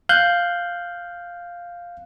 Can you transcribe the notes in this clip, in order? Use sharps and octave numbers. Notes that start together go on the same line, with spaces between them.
F5 F#6 G6